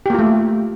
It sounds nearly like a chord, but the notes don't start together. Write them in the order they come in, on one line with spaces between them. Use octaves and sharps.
G4 A#3 F4 A3